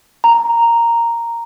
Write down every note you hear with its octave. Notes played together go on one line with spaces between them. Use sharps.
A#5